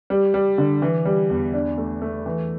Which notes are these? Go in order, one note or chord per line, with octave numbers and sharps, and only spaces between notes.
G3
G3
D3
E3
G3
E2
D4
A3
A3
E3